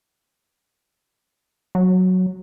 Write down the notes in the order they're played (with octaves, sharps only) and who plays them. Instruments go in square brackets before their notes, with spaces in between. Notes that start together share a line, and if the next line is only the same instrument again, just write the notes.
[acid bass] F#3